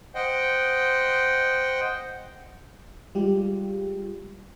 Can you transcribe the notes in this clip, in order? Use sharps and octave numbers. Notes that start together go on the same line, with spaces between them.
C5 D#5 F#5 G5
G3 G#3 F4 G4